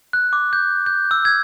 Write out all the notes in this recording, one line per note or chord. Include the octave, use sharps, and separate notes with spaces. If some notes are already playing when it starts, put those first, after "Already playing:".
F#6
D6
G6
G6
E6
G#6